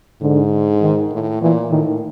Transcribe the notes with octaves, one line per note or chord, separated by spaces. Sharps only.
G#2 D3
D#3
A2
A#2 E3
A2 D#3